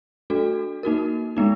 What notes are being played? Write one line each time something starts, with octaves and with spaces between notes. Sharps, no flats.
A3 D4 F#4 A4
A#3 D#4 F#4 A#4
G#3 B3 D#4